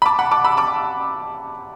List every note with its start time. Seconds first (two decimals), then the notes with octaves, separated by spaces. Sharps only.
0.02 B5
0.06 A5 D6
0.19 F#5 B5
0.32 A5 D6
0.44 B5 E6
0.57 A5 D6